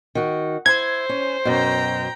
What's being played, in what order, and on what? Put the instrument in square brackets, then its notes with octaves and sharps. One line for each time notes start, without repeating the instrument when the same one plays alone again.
[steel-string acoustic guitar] D#3 F#4
[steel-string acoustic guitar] E4 [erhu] C5 [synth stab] G#6
[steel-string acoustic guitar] C#4
[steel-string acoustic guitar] F#2 B2 [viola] G5 A#5